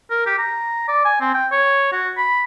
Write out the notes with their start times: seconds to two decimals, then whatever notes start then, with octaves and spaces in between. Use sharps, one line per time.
0.11 A#4
0.26 G4
0.39 A#5
0.88 D5
1.05 G#5
1.20 C4
1.34 G5
1.52 C#5
1.92 F#4
2.17 B5